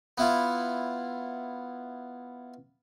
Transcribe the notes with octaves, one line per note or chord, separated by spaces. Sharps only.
B3 E4 F4